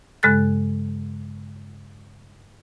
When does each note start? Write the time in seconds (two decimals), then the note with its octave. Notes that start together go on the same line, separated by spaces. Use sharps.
0.23 G2 C#3 G#3 A4 F#6 A6